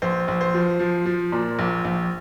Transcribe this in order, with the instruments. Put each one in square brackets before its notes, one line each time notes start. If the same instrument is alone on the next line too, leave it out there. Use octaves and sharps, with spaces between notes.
[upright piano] A#1 C5
A#1
C5
F3
F3
F3
A#2
A#1
A#1